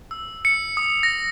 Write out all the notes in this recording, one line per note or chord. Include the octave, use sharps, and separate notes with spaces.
E6
C#7
D#6
A#6